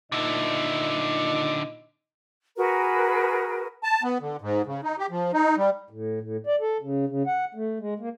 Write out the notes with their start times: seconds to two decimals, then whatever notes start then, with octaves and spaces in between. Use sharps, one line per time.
0.12 A#2 D3 D#4 E4 D#5
2.57 F#4 G#4 A#4 B4
3.83 A5
4.03 B3
4.21 D3
4.41 G#2
4.66 C#3
4.83 D#4
4.98 G4
5.10 F3
5.33 D#4
5.57 G3
5.90 A2
6.21 A2
6.47 D5
6.61 A4
6.82 C#3
7.07 C#3
7.27 F#5
7.55 A3
7.80 G#3
7.99 A#3